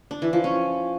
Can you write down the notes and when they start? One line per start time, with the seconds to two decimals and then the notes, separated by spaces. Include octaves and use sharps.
0.11 D4
0.22 E3
0.33 F3
0.44 C#4